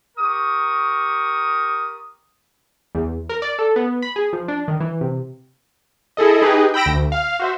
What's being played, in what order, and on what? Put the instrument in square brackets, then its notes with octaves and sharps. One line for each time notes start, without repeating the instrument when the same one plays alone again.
[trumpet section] G4 A#4 C#6 D#6
[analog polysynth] E2
A#4
D5
A4
B3
B5
G#4
F3
D4
D#3
E3
C3
E4 G#4 A4 D#5
D#4 G4 G#4 B4 D#5
G5 B5 E6 A#6 D7
D2
F5
F#4 C5 E5